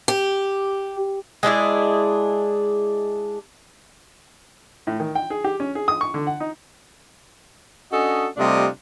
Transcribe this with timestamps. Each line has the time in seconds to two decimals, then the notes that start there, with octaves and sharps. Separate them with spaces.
0.08 G4
1.43 G#3 D4 E4 G#4
4.87 A2
5.00 D#3
5.15 G5
5.30 G#4
5.44 G4
5.60 C#4
5.75 G#4
5.88 D#6
6.01 C#6
6.14 D3
6.27 F#5
6.40 D#4
7.91 C#4 D4 F#4 A4 D#5
8.37 C3 G3 A3 D4 F4 D#5